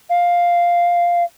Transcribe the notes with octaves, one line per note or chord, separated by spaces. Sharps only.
F5